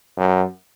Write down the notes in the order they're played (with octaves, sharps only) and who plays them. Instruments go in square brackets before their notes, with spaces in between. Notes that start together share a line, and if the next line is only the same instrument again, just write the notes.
[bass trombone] F#2